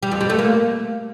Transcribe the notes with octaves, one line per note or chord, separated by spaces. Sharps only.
G3
F2
G3
A3
A#3